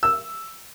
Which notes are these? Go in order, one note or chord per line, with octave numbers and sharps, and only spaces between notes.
E6